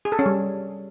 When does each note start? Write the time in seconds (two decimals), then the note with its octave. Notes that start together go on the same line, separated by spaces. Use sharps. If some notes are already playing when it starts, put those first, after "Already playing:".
0.05 G#4
0.12 A4
0.19 C#4
0.26 G3